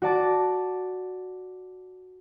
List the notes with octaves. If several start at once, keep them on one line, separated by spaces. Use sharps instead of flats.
F#4 D5 A5 D6